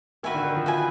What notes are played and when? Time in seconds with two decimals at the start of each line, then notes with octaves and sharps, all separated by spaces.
0.23 D#3 F#4 B4 E5 G#5
0.34 D3
0.45 D#3
0.55 F3
0.66 F#4 B4 E5 G#5